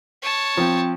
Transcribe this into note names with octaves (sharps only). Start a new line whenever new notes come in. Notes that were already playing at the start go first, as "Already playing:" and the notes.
C#5 A5
F3 C4